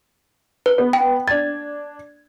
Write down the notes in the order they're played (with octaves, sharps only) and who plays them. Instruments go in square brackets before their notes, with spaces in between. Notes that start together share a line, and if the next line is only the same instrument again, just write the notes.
[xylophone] B4
[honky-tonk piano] B3
[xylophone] G5
[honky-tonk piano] D4 G#6 [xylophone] A6